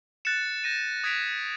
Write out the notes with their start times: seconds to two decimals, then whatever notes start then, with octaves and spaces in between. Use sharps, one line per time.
0.25 F#6 A6 C#7 E7
0.64 G6 A#6 D#7
1.04 D#6 G#6 B6 D7 F7